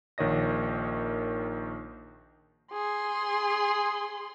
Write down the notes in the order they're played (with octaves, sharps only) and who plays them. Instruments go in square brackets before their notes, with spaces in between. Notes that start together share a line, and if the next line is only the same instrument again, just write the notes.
[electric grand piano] A#1 D#3 C#5 D#5 A#6
[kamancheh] G#4 C6